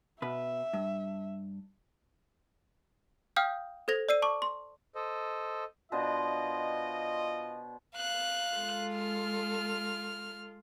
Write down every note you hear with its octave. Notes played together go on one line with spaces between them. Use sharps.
B2 B4 E5
G2
F5 G5 D#6 F6 G6
A4 C5 G#6 A#6 F7
D5 E6 C7 D#7
A5 C#6 D6
C6
A4 C5 D#5
B2 D4 F4 C5 D#5
F5 F#6
G#3 F4 A4
F6